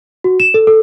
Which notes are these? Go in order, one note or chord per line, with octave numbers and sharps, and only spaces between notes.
F#4
E7
A4
A4